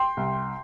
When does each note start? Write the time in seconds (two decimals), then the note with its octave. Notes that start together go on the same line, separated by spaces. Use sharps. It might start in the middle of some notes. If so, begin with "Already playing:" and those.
Already playing: G5 C6
0.17 C2